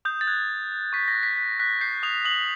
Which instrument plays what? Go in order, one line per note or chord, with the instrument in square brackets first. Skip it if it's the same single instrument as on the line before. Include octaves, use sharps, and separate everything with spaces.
[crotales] D#6 G6
A6
F#6 G#6
D#6
D#6
C#6 B6
A#6
F#6
B6
F#6 B6
F#6 B6
G6 C7
D#6 F7
D#6 F#7